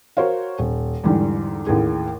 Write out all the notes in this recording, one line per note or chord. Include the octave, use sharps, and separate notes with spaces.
F#4 A#4 C5 C#5 F5
D#1
E2 G#2 D3 G3
A1 D#2 A2 G#4